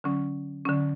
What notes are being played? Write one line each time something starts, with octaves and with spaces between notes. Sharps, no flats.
D3 F#3 C#4
D3 F#3 C#4